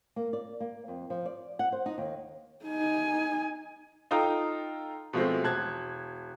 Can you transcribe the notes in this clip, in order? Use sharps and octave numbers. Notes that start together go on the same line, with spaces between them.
A#3
D5
A#3
F2
F3
D5
F#5
C5
D#4
D#2
D#4 G#5
D#4 F4 A4 G5 A#5 D#6
B2 F3 G#3 A3 C4
E1 A5 F#6 G#6